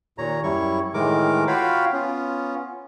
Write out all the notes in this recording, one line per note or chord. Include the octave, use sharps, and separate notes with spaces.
D#2 A#2 C#5 A#5
F#2 G3 E4 C#5 C#6
A2 D#3 E3 G#3 A#4 D6
F4 F#4 C#5 F5 G5 B5
B3 C#4 F4